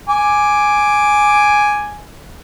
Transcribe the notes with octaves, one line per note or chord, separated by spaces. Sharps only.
G#5 D6